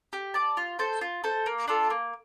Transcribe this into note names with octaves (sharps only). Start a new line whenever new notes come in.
G4
D5 A5
F4
A4 C5
F4
A4 C5
A#3
D4 F4 A4
A#3